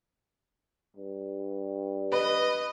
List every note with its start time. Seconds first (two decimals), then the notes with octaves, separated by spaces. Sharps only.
0.97 G2
2.12 B4 D#5